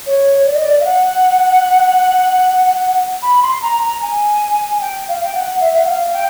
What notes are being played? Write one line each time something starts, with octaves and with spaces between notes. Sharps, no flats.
C#5
D5
D#5
D5
F5
F#5
B5
C6
A#5
A#5
G#5
G#5
G5
F5
G5
F#5
E5
F#5
F5
G5